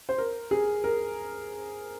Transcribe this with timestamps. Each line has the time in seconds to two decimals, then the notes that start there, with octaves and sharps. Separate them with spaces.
0.09 C5
0.18 A#4
0.51 G#4
0.84 A#4